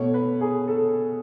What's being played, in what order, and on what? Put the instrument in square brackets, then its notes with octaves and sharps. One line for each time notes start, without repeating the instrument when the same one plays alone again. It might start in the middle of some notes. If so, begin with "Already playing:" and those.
Already playing: [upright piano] B2 A3 C#5
B4
G#4
A4